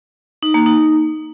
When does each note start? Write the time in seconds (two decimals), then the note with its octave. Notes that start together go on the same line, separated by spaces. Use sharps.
0.43 D#4
0.54 A#3
0.66 D#4